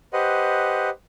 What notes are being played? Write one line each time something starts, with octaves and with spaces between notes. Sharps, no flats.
G4 B4 C5 D#5 F#5